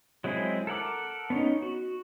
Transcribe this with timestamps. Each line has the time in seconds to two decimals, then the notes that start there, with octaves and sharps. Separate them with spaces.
0.24 F#3 G#3 C4 E4 G#4
0.67 A4 A#4 F#5 D6
1.30 B3 C#4 D#4
1.62 F#4